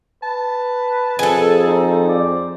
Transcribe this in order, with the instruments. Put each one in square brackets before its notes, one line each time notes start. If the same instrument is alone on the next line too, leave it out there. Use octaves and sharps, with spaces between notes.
[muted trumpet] B4 [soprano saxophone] A5
[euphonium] F2 [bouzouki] G#4 A4
[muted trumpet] D#4 [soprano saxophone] C5
[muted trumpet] D5